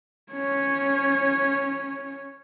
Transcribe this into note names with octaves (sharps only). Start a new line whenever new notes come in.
C#4 C#5